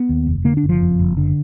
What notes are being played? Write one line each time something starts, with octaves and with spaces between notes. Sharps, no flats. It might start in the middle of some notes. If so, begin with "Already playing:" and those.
Already playing: B3
D#2
F1
D3 A#3
D4
F#1
F3
F2
F#1
D3